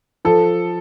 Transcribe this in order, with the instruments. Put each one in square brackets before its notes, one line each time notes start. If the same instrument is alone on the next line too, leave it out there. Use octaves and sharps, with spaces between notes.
[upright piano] F3 A4